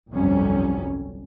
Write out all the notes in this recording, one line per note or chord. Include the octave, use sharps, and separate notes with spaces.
G1 C2 F2 F#3 G3 C#4